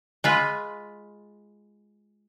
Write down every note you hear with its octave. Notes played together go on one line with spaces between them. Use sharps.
G#3 F4 B4